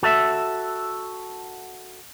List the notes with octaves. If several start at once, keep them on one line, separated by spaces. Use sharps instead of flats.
F#4 A4 E5